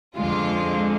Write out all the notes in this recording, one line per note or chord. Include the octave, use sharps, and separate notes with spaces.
F2 D3 G#3 F4